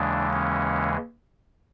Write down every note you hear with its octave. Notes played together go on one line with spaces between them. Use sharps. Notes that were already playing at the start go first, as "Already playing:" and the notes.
Already playing: D#2 C#3 E3 G#3 D4
C#4